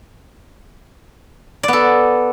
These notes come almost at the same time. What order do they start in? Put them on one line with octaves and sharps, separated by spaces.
D5 B3 A4